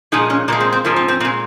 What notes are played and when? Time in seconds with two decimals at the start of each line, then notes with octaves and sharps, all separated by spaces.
0.12 A#2 F3 G#3 D#4
0.30 C#4
0.48 A#2 F3 G#3 A#3
0.60 C4
0.73 C4
0.85 G#2 F3 A#3
0.96 C4
1.08 C4
1.20 A#2 C4
1.25 G#3